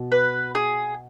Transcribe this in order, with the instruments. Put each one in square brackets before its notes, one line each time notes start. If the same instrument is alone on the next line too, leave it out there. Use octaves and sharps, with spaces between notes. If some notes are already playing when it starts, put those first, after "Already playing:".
Already playing: [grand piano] B2
[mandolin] B4
G#4